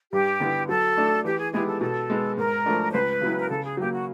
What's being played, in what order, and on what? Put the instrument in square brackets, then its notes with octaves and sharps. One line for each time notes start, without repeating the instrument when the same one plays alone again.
[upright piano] G2 [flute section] G4
[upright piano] D3 G3 B3 E4
[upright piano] F#3 [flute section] A4
[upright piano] A3 D4
[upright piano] E3 [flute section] G4
[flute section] G#4
[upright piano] G#3 B3 E4 G4 [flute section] G#4
[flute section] A4
[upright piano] B2 [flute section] A4
[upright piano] G#3 B3
[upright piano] G#2 [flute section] A#4
[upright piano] F3 A3 D4
[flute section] C5
[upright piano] C#2 [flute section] B4
[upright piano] C#3 F#3 B3 E4
[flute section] A#4
[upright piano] C#3 [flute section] A4
[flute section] G#4
[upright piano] F#3 A#3 [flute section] G4
[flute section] F#4